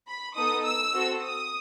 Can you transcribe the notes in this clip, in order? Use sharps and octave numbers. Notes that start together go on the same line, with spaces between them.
B5
B3 D#4 A4 D#6
E6
C4 F#4 A4
D#6